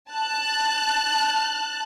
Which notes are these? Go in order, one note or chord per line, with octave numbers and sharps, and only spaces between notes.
A5 F#6